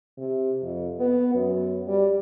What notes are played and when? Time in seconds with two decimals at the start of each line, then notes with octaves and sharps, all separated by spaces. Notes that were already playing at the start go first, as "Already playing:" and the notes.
0.18 C3
0.62 F2
0.99 B3
1.35 F#2
1.88 G3